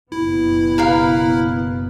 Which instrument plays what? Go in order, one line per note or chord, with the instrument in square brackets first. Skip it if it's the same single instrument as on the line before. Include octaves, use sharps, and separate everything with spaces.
[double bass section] F#1 B2 B3 [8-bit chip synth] E4
[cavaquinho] A#4 B4 F5